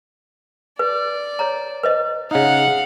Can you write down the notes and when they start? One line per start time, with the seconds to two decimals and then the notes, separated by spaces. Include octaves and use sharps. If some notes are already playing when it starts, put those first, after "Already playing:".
0.79 B4 D5
1.39 C#5 A#5
1.83 B4 C5 D#5
2.31 C#3 D#4 F5 F#5